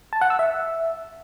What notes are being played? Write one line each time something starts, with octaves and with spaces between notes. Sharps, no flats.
A5
F#5
E6
E5